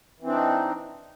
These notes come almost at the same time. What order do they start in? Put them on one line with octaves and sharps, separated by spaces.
E3 C4 D4 D#4